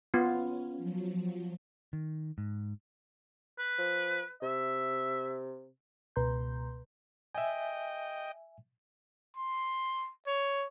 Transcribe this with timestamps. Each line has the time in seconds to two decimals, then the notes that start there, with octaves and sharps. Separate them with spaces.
0.14 B3 C#4 F4
0.77 F3 F#3
1.93 D#3
2.38 G#2
3.59 B4
3.79 F3
4.42 C3 E5
6.16 C#2 B2 B4 A#5 C6 G6
7.35 D#5 E5 G5 G#5
9.37 C6
10.27 C#5